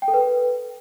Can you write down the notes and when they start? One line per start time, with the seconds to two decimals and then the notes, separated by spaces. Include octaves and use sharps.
0.02 G5
0.08 A4
0.14 B4